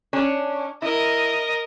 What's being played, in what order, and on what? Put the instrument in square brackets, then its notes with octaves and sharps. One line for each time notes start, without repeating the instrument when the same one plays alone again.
[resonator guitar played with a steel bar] C#4 D4
[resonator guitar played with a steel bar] E4 [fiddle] A#4 D#5